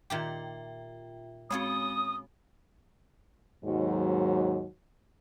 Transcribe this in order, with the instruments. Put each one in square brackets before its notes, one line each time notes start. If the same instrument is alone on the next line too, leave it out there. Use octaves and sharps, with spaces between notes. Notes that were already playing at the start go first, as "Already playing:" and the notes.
[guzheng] A#2 D#3 G4 [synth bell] F4 E5 G5
[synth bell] G#3 C4 F#4 [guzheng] C#4 G#4 C#5 [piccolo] D#6
[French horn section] D#2 G#2 F#3